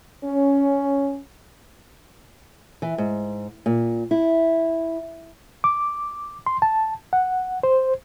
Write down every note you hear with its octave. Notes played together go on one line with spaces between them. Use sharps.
C#4
E3
G#2
A#2
E4
D6
C6
A5
F#5
C5